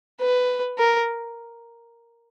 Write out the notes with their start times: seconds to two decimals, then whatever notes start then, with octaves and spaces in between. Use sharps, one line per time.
0.20 B4
0.78 A#4